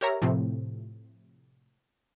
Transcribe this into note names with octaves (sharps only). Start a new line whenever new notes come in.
G4 A#4 C#5 E5 A#5
A2 C3 F3 A3 C4